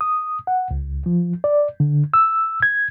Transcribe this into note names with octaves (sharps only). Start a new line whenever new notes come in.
D#6
F#5
C#2
F3
D5
D3
E6
G#6